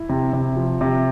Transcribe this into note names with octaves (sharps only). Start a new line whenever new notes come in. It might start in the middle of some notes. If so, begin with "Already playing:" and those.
Already playing: E4 E5
C3
C3
F3
C3